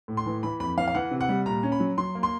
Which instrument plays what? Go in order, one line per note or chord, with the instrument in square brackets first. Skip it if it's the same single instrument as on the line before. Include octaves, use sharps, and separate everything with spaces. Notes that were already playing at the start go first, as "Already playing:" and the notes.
[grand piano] A2
C6
E3
E3 B5
F2 B5
E3 F5
F5
E3 F#5
C3
F#5
G3
A#2 A#5
C#4
B5
F#3
F#3 C6
A#3
C6